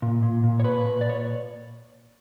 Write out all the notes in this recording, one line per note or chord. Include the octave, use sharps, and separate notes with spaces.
A#2
A#2
A#2
C#5
A#2 B4
A#2
D5
A#2 C#5